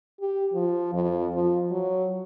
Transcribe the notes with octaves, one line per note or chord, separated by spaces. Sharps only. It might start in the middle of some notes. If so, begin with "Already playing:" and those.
G4
F3
F2
F3
F#3